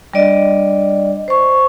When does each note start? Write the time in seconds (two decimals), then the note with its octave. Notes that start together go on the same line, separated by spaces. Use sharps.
0.14 G3 D4 D5 D#5
1.28 C5 C#6